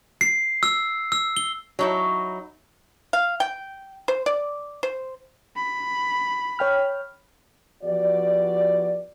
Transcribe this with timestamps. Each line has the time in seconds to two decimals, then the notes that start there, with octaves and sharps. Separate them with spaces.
0.21 C7
0.63 E6
1.12 E6
1.37 G7
1.79 F#3 D#4 E4
3.13 F5
3.40 G5
4.08 C5
4.26 D5
4.83 C5
5.56 B5
6.59 C#5 G5 F6
7.83 F3 B3 F#4 G4 D5